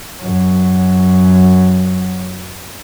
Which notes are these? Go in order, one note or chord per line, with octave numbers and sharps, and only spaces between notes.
F#2 F#3